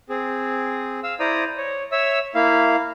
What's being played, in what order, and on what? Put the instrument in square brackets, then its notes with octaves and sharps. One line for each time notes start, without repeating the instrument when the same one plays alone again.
[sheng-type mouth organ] C4 G#4
F5 E6
E4 C5 D5 A#5 D#6
C#5
C#5 E5 E6
A#3 E4 F5